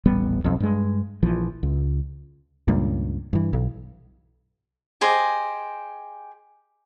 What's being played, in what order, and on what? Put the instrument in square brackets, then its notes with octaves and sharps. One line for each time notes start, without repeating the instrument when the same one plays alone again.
[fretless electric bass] D#1 A1 G3 B3
B1 F2
G2 G#3
A#1 E3 F3
C#2
[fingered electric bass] C#2 G2 A#2
G2 E3
B1
[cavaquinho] G4 G#4 C5 D#5